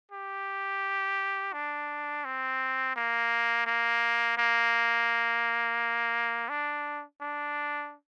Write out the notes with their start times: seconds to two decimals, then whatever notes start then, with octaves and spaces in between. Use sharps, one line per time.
0.12 G4
1.53 D4
2.25 C4
2.96 A#3
3.66 A#3
4.38 A#3
6.49 D4
7.21 D4